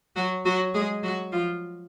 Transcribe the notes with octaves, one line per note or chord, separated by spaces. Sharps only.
F#3 F#4
F#3 F#4
G#3 G#4
F#3 F#4
F3 F4